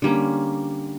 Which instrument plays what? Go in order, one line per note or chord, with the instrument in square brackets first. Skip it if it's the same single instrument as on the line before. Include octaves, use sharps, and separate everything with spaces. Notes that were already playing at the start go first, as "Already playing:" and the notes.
[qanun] D3 G3 A#3 C#4